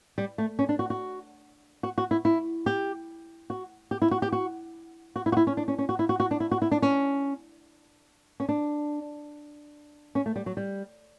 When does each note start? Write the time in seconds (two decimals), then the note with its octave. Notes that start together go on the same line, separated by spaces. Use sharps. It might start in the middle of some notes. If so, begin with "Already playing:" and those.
0.18 G3
0.38 A3
0.59 C#4
0.69 D4
0.79 F#4
0.90 F#4
1.83 F#4
1.98 F#4
2.11 E4
2.25 E4
2.66 G4
3.50 F#4
3.91 G4
4.02 E4
4.11 F#4
4.22 G4
4.32 F#4
5.16 F#4
5.26 E4
5.32 F#4
5.37 E4
5.47 C#4
5.57 D4
5.68 C#4
5.78 C#4
5.89 F#4
5.99 E4
6.09 F#4
6.20 F#4
6.31 D4
6.40 E4
6.51 F#4
6.62 E4
6.71 D4
6.82 C#4
8.40 C#4
8.49 D4
10.15 C#4
10.26 A3
10.36 G3
10.46 F#3
10.57 G3